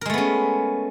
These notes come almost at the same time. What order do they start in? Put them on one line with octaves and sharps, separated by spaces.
A#4 G#3 A3 B3 C#4